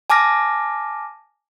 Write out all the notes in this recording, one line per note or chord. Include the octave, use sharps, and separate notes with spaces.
G#5 A5 D6 F6 A#6